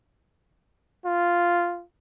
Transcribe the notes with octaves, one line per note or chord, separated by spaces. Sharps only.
F4